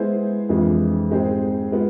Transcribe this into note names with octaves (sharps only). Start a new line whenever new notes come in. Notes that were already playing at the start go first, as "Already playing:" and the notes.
Already playing: G#3 B3 E4 G#4 C5
F2 E3 G#3 D4 F4
G#2 G#3 C4 G#4
G#3 B3 F4